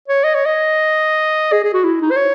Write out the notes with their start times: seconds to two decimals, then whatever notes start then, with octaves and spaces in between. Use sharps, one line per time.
0.08 C#5
0.24 D#5
0.34 C#5
0.46 D#5
1.52 G#4
1.64 G#4
1.74 F#4
1.84 E4
2.02 D#4
2.11 C5
2.16 C#5